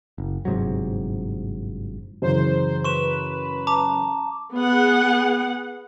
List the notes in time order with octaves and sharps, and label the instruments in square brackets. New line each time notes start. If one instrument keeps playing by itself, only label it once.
[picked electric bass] F#1
G1 G#2 C3 F#3
[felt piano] F#2 C#3 E3 [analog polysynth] C5
[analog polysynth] B4 [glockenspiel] C6 C#6 E7
[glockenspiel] A5 A#5 D6
[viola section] B3 G#4 F#5